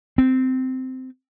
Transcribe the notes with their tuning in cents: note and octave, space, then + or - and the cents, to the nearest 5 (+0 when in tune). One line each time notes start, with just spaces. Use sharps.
C4 -15